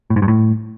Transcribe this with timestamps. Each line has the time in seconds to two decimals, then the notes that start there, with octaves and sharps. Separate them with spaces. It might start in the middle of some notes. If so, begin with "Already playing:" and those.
0.10 A2
0.16 G#2
0.22 G2
0.28 A2